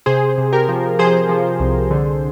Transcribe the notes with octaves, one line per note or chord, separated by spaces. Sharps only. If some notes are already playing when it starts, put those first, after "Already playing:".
C3 G#4 C5
C3
G4 A#4
F3
F3 G#4 C5
F3
C2
D3